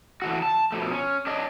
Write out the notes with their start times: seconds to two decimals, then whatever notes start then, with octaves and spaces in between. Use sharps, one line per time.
0.22 E3 A3 F#4
0.42 A5
0.72 B2 F3 A3
0.92 C#4
1.27 D4 C#5 D#5